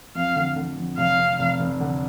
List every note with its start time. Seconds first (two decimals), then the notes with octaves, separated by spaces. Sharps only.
0.15 F2 F5
0.36 D3
0.56 D3
0.77 F2
0.97 F1 F5
1.19 F1
1.39 F1
1.60 F1
1.80 D3